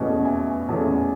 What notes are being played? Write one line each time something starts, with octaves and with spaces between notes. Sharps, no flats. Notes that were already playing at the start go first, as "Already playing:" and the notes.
Already playing: E2 B2 A3 C#4 D#5 F#5
E5 G#5
E2 B2 A3 C#4